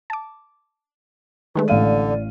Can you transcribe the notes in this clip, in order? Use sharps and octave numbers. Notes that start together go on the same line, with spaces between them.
A5 D6
D#3 G#3 A3 B4
A1 D3 D5 F5 D#7